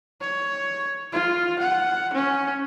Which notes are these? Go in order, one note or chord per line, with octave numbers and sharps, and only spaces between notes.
C#5
F4
F#5
C#4